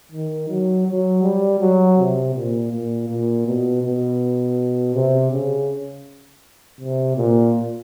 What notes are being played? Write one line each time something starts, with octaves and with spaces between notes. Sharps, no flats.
D#3
F#3
F#3
G3
F#3
C3
A#2
A#2
A#2
B2
B2
C3
C#3
C3
A#2